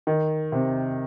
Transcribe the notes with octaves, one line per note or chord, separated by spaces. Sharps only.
D#3
C3